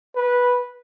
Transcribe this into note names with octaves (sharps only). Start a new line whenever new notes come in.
B4